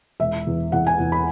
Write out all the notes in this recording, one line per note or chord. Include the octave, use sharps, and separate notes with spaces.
E1 E5
E2
E2 F#5
G#5
E2
B5